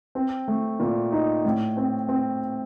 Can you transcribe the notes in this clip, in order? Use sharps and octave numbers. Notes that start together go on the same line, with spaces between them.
C4
A3
A#2
D#4
A2
C4
C4